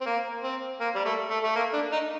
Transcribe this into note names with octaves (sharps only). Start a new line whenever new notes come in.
C4
A#3
C4
A#3
G3
A3
A3
A3
A#3
D4
D#4